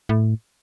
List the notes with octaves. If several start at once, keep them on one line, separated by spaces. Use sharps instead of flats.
A2